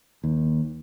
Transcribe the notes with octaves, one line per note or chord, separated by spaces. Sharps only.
D#2